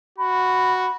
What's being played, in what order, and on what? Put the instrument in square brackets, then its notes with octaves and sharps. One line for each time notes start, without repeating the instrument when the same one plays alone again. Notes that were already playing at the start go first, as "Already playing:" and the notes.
[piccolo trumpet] F#4 [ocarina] B5